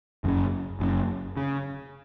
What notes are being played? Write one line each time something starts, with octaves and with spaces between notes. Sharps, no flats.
F#1 F#2 C#3
F#1 F#2 C#3
C#3